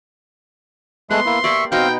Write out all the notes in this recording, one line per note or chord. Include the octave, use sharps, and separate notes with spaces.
G#3 A3 B3 C6 F#6
A#3 E4
A#3 G4 D5 E5 C#6
B2 C4 D#4 F5 G5